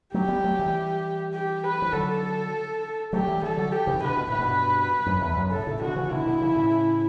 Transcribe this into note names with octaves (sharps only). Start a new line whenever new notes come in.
F#3 A3 G4
G3 B3
F#3 A3
E3 G3
G4
B4
E3
D3 F#3 A4
F#3 A3 G4
E3 G3
E3 G3 A4
D3 F#3
G4
C#3 E3
B2 D3 B4
B2
A2 B4
G2 B2
F#2
E2
F#2
A2 C#3 A4
A2 C#3
B2 D3 F#4
C#3 E3
B2 D3 E4
B2 D3
C#3 E3
A2 C#3